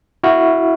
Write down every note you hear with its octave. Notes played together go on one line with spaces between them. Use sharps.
E4 F#4